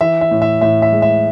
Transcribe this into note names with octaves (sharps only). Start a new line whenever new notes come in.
E3 E5
E5
A2
E5
A2 E5
E5
G#3
E5